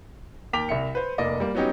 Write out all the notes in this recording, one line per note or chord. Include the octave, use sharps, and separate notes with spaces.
D#2 A#4 G5 D6 B6 F7
C2 E5 C#7
B4 C5
F1 A#3 D5 D#5
G3 A#3
F#3 B3 C#4 D#4 G4